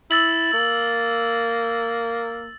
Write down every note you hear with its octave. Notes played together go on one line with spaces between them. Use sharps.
E4 E6 A6 F#7
A#3